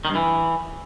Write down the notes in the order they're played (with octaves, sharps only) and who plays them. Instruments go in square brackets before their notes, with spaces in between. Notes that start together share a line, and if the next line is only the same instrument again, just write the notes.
[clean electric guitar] D#3
G2
E3